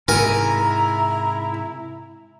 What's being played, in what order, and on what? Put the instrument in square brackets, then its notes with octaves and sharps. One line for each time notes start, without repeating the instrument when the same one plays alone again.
[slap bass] G#2 C3 [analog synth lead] E4 [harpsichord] A#4 G#5 [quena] A#5